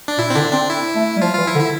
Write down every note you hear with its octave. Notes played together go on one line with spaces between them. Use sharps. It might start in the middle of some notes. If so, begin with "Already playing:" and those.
D4
A#2 E4
C4
D3 D4
C4 D4
E4
A3
G3
F3 F4
E3 F4
E4
D3
E4